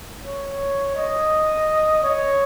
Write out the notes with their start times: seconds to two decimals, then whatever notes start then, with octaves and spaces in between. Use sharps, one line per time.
0.25 C#5
0.96 D#5
2.03 C#5